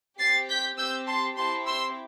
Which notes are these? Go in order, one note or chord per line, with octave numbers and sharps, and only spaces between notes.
C4 G4 A6 C7
G6 B6
C4 G4 E6 G6
A5 C6
C4 E4 G4 A5 C6
C6 E6